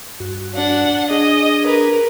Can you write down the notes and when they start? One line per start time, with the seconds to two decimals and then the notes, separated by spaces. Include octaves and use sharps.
0.20 G2 F#4
0.55 D4 F#5
1.10 D4 G#4 D#5
1.65 A#4 B4